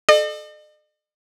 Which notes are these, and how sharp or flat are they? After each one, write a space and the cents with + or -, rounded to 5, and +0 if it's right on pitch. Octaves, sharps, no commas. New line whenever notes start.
A4 -25 D#5 -45